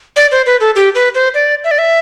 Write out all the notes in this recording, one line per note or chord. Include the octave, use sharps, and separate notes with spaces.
D5
C5
B4
A4
G4
B4
C5
D5
E5
D5
E5